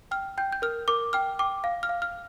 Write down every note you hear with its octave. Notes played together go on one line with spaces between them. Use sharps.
G5 F6
G5 G6
G6
A#4 F6
A#4 D6
G5 F6
G5 D6
F5
F6
F5
F6